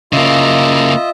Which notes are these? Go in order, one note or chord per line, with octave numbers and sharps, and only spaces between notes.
C#3 A#3 F4 D#5 E5